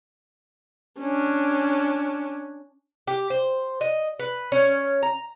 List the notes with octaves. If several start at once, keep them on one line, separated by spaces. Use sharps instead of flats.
C#4 D4
G4
C5
D#5
B4
C#4
A#5